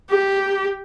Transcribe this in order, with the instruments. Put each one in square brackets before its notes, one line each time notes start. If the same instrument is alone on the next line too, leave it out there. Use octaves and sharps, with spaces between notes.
[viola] G4